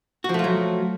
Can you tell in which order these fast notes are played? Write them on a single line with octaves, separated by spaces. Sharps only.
F#4 F3 A3 F4 F#3